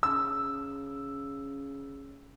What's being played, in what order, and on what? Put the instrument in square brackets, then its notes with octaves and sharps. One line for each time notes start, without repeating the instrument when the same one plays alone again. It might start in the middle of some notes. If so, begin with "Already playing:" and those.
[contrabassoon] C#3 [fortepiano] E6